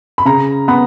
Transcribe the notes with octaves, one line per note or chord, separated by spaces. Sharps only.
B5
C#3 A#5
B3 B5